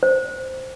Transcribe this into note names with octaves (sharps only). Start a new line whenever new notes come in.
C5